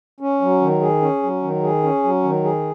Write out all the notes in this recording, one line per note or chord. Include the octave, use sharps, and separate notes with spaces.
C#4
F#3
D#3
G#4
C#4
F#3
D#3
G#4
C#4
F#3
D#3
G#4